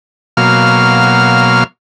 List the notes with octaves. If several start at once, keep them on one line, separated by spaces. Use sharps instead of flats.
B2 F#3 A#3 F5 F6